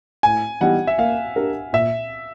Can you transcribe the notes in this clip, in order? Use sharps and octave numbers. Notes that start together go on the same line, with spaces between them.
A2 G#5
E3 G3 B3 D#4 F#5
E5
A#3 F5
D4 G4 A#4
A#2 E5